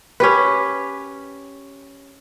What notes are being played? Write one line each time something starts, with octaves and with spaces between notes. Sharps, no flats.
C#4 G4 B4